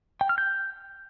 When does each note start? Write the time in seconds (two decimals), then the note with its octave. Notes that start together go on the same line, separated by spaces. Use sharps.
0.21 G5
0.29 F6
0.38 G6